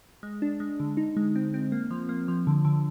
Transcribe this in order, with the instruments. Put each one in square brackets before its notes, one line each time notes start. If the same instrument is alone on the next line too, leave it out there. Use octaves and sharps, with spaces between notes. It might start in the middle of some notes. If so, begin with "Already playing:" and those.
[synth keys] G#3
D4
G#3
D3
D#4
G#3
C4
C4
A#3
F3
A#3
F3
D3
D3